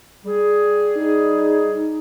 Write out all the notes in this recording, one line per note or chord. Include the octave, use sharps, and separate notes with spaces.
G3 G#4
D#4